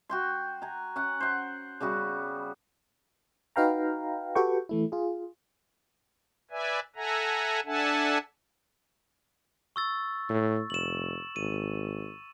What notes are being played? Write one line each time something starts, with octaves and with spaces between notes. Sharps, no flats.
F#4 G5 C6
G#5 A#5
C#4 F#5
C5 F#5
C#3 G3 B3 F#4
D#4 F#4 B4 F5 G5 A#5
F#4 G4 A4 B4 G5 C#6
E3 A3 E4
F4 G#4
B4 D5 E5 G#5
A4 E5 F#5 G#5 A#5
D4 A4 E5 F#5 G#5 A5
C#6 E6 A6
A2
F1 E7 F#7
G#1 D#7